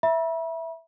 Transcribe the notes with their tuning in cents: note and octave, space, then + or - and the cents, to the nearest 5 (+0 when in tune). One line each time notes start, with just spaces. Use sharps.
E5 +0 B5 -40